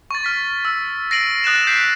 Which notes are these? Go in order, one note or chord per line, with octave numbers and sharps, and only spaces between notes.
C#6 A6
F6 B6
E6
A#6 C7 D7 D#7 F#7
D#6 F#6 A6 E7
G6 B6 C7 D7